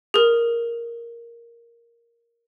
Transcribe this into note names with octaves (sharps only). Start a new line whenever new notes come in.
G#4 A#4